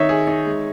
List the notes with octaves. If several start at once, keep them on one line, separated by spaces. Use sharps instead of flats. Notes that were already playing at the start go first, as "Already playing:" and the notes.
Already playing: D#3 D#4 C#5 E5
G#4
D#4
G#3